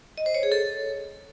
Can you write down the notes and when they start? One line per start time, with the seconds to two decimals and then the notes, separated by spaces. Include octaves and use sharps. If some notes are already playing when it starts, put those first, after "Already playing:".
0.18 D#5
0.26 C5
0.35 C#5
0.43 G#4
0.52 A4